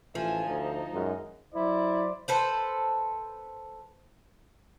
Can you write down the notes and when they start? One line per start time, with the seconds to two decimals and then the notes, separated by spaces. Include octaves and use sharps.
0.15 A1 F3 E5 G#5
0.47 D2 D#4
0.93 F#2 D#3 G#3
1.54 F#3 E4 C5 D5
2.28 A4 B4 C5